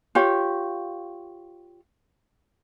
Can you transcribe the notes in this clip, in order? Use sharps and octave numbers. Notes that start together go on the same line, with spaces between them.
F4 G4 C#5